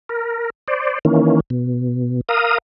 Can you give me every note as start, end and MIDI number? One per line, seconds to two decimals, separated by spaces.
0.09 0.50 70
0.68 0.99 72
0.68 0.99 74
1.05 1.40 51
1.05 1.40 52
1.05 1.40 58
1.05 1.40 61
1.50 2.21 47
2.29 2.58 70
2.29 2.58 77
2.29 2.58 87